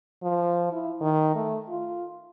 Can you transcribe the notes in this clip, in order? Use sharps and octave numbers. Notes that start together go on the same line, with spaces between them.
F3
E4
D#3
A3
F4